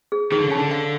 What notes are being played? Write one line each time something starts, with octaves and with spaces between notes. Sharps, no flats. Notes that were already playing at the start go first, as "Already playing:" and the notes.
G#4
D#3 G#4
D3
C#3
D3 A5
F5